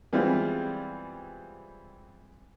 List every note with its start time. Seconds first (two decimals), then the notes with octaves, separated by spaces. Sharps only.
0.13 E3 G3 G#3 B3 C4 F4